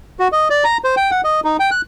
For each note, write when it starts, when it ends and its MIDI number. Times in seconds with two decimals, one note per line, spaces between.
0.19 0.28 66
0.32 0.48 75
0.50 0.64 74
0.64 0.77 82
0.84 0.95 72
0.97 1.11 79
1.11 1.21 78
1.24 1.40 75
1.44 1.57 63
1.60 1.70 79
1.71 1.81 90